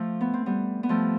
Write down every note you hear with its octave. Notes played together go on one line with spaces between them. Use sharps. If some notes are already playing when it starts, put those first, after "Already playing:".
Already playing: F3 A3
B3
C4
G3 B3
B3
F3 A3